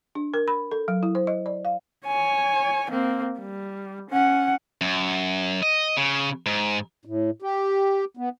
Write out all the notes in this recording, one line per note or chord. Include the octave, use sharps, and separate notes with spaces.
D4
A#4
B5
A4
F#3
E4
C5
D#5
D5
F5
C#5 G#5
A#3 C4
G3
C#4 F#5
F#2
D#5
C#3
G#2
A2
G4
B3